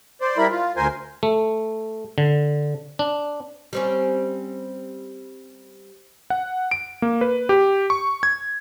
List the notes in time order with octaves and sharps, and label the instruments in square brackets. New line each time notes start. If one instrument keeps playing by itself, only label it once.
[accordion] C5 D5
G3 E4 A#4 B5
F4
D2 A#4 C5 G#5
[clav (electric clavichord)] A3
D3
D4
[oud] G3 C4 C#4
[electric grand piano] F#5
D7
A#3
B4
G4
C#6
G#6